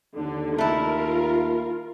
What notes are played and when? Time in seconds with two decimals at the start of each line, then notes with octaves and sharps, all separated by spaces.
0.17 D#2 D3
0.58 A3 E4 F4 A#4